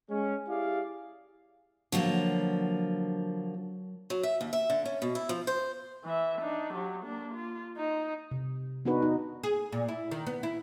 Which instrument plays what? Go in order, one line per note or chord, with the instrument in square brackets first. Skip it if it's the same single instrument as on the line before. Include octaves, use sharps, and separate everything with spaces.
[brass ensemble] G#3 C#4
E4 G4 G#4 D5 F5
[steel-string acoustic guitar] D3 F3 A#3 [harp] F#3
[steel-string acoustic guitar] F#3
E5
D#2
E5
D3
C#4
B2
E4
F3
C5
[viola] E3 E5
D4 D#4
F#3 G4
A#3 D4
F4
D#4
[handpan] C3
B3 D4 D#4 F#4 B4
D#4
[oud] G#4
A#2
E4
D#3
B3
E4